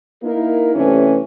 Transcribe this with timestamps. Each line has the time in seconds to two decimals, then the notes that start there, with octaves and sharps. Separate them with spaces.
0.23 A#3 D#4 E4 A#4
0.74 G2 C3 E3 A3 C#4